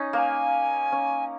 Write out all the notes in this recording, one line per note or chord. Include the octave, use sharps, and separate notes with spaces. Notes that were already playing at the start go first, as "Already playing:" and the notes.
Already playing: C#4 D#4
A#3 G#5 A#5
C#4